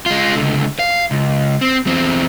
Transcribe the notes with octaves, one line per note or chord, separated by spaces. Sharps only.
G#3 F4
C#2 D3
F5
C#2
C4
E2 C4